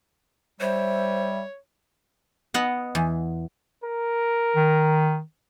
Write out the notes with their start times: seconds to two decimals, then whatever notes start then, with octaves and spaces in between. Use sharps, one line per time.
0.61 G3 C5 C#5 E5
2.54 B3 D#5 F#5
2.95 E2
3.84 A#4
4.56 D#3